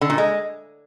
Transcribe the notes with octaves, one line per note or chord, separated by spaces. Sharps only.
D3
A#2
G#3